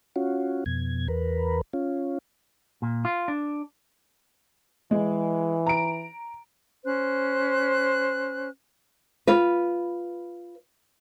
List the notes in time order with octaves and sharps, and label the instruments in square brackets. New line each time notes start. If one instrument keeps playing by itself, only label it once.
[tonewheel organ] C#4 F4 F#4
F2 B2 G#6
E2 A#4 B4
C#4 F4
[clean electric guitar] A#2
F4
D4
[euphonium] E3 [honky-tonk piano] G#3
[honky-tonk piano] A#5 D7
[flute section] C#4 C5 F#6
[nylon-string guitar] F4 B4